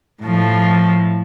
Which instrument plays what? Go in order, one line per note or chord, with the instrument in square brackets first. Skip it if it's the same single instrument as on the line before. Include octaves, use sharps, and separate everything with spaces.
[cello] A2 F3